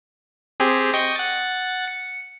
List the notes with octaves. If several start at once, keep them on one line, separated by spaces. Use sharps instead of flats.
C4 G4 G#4
D#5 G5 C#6
F#5 A6
C#7